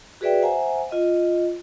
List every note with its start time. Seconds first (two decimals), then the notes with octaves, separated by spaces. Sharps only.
0.21 F#4 G#4 B4 D5 E5 G5
0.42 C5 E5 F#5 G#5 A#5
0.91 F4 D#5